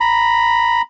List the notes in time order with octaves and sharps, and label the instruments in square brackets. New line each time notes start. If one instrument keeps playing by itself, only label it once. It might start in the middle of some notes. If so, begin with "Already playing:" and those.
[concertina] A#5 B5